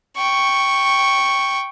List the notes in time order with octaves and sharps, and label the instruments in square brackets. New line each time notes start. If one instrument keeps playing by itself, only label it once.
[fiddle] G5 C#6